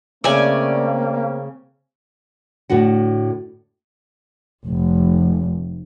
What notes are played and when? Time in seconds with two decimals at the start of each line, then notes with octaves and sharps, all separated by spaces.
0.24 C#3 A3 A#3 C4 D5 G#5
2.70 A2 D3 F#4 F#5
4.65 F1